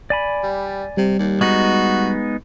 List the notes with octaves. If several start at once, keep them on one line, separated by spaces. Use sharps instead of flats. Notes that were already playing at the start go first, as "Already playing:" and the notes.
D5 G#5 B5
G3
C3 G3
D#2
G#3 B3 D#4 F#4